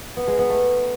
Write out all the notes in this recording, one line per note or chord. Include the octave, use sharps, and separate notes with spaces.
B3
G#3
B3
A3